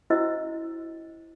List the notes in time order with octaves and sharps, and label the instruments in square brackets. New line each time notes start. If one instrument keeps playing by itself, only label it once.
[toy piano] C#4 E4 F#4 C5 D#5 E6